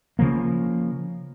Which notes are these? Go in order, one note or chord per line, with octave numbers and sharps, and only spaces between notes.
C#3 F3 A#3